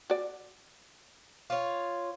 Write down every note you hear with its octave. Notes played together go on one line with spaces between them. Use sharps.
F#4 D5
F4 C#5